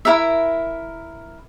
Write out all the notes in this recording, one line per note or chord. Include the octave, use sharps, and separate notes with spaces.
E4 G4 A#4 E5